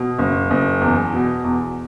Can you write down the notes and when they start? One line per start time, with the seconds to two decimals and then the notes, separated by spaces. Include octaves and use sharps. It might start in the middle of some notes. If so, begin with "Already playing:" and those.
Already playing: B2
0.19 F#1
0.51 F#1
0.81 E2
1.13 B2
1.44 E2